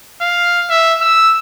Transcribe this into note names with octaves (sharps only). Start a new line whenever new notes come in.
F5
E5
E6